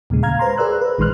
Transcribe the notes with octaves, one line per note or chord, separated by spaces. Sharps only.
D#2 A#2 C#3 G#3
F5 A#5 F6 G#6
B4 C5 A#5 C6
G#4 A#4 B4 D5 E6 F#6
B4 C5
A#1 D#3 G#3 C6 F6 F#6